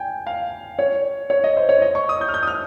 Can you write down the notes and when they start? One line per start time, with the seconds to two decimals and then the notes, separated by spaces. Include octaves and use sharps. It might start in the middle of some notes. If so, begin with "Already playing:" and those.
Already playing: G5 G#5
0.27 F5
0.79 C#5
1.30 C#5
1.44 D#5
1.57 C5
1.69 C#5
1.82 D#5
1.95 C#6
2.09 D#6
2.21 G6
2.29 F6
2.34 G6
2.43 D#6
2.47 F6